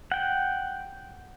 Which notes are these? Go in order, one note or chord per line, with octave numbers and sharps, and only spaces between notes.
F#5 G5